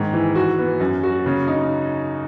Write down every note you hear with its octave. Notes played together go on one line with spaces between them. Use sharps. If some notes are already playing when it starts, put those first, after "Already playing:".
Already playing: G#2 D#3
E3
F#4
B3
F#2
F#4
C#3
D#4